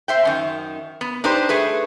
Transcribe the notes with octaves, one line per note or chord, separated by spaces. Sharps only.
C5 E5 G5
F#2 D#3
B3
D4 D#4 G4 B4 C5
A3 G#4 B4